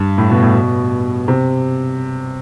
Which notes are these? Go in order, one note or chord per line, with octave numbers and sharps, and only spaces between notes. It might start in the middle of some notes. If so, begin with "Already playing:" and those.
Already playing: G2
A2
B2
A2
B2
C3